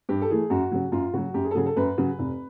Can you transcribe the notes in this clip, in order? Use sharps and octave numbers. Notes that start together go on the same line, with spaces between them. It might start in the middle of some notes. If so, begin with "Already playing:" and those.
G2 G4
A4
E3 A3 G#4
F#2 F#4
C#3 F#3
F#2 F4
C#3 F#3 F#4
F#2 G4
G#4
A4
C#3 F#3 G#4
A4
F#2 B4
C#3 F#3
F1